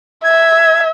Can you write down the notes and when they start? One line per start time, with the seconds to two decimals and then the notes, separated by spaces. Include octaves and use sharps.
0.24 E5 G#6